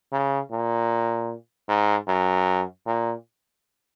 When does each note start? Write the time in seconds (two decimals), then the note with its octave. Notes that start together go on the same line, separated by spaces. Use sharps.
0.12 C#3
0.51 A#2
1.68 G#2
2.08 F#2
2.86 A#2